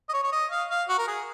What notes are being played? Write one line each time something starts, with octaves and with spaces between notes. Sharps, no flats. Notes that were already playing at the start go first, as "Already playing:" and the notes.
D#5
C#5
C#5
D#5
F5
F5
F#4
A#4
G#4